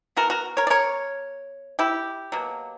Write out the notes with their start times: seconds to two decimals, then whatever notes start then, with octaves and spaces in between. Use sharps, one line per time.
0.16 E3 B3 F#4 A#4
0.30 F#4 A#4
0.57 A#4 C#5
0.67 D5
0.70 A#4 C#5
1.79 E4 G4
2.32 B2 F#3 A#3